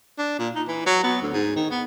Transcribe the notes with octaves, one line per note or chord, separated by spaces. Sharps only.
D4
A#2
D#4
E3
F#3
B3
D2
G#2
D#3
B3